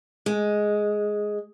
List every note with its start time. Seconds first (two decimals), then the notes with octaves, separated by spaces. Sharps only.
0.26 G#3